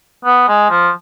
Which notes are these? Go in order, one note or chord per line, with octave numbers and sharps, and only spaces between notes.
B3
G#3
F3